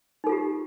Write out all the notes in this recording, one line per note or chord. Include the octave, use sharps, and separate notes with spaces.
D#4 F4 G4 A4